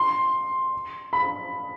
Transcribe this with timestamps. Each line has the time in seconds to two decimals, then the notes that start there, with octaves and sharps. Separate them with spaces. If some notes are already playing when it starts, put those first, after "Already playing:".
Already playing: C6
1.13 B5